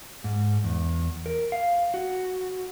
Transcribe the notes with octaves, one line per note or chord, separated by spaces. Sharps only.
G#2
E2
A#4
F5
F#4